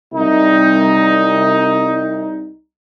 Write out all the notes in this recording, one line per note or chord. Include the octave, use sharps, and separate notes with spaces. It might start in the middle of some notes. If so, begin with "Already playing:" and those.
C2 D#4